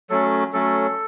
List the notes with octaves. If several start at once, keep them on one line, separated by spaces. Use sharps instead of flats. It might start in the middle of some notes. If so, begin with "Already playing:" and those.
F#3 A3 C#4 A4
F#3 A3 C#4 A4